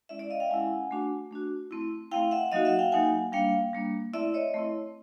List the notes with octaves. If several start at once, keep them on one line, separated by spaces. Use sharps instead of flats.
G#3 C#4 E4 D5 E5
D5 E5
D#5 F5
F5 G5
G#3 C#4 E4 F#5 G#5
A3 D4 F#4
A3 D4 F#4
A3 C4 E4
A3 C4 E4 F5 G5
E5 F#5
F#3 A#3 D#4 F#4 D#5 F5
E5 F#5
F5 G5
F#3 A#3 D#4 F#4 F#5 G#5
G3 A#3 D4 F5 G5
G3 A#3 D4
A3 C4 E4 D5 E5
C#5 D#5
A3 C4 E4